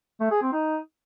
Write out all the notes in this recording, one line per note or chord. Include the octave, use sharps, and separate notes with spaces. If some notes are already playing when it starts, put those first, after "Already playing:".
A3
G#4
C4
D#4